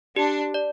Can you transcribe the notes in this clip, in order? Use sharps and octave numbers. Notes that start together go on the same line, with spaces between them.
D4 G4
D5